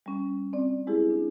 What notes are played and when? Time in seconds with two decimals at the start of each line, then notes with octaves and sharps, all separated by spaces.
0.06 G3 C#4
0.53 C4 D5
0.87 G#3 E4 G4 G#4
1.10 D4